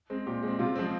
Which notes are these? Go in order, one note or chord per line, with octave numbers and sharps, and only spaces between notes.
G#3 C4
A#2 G4
G#3 C4
C3 F4
F3 G#3 C4